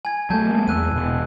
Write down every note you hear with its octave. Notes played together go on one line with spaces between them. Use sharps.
G#5 G#6
F#3 G3 A3 A5 G6 G#6
G#3 A#3
E2 E6 F#6 D#7
E1 B2